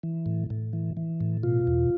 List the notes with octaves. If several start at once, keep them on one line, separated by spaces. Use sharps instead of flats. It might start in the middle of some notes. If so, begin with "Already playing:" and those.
E3
A2
A2
E3
E3
A2
B2 F4
E2